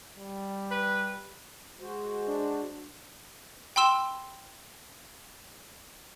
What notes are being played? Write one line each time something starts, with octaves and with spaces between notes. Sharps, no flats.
G3
B4
G#3 F#4 C5
D4
G5 B5 C6 E6 E7 G7